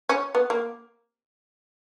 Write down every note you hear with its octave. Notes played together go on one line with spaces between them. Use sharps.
C#4
B3
A#3